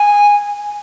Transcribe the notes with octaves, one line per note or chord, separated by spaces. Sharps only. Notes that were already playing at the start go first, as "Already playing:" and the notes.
Already playing: G#5